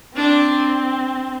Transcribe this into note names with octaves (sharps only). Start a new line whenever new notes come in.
C4 D4